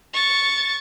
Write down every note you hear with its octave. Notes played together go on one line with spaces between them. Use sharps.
C#6 A6